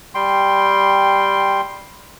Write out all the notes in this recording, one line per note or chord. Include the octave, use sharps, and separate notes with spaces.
G3 G5 C6